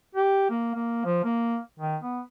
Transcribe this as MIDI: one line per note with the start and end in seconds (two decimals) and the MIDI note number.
0.15 0.50 67
0.50 0.73 58
0.74 1.03 58
1.05 1.21 53
1.24 1.58 58
1.79 1.97 51
2.02 2.20 59